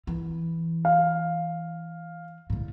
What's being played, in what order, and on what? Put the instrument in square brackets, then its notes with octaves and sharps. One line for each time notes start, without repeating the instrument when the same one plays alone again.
[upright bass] E3
[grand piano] F5
[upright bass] A2 D3